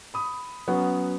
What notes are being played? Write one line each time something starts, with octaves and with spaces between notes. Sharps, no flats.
B5 D#6
F#3 B3 C#4 F#5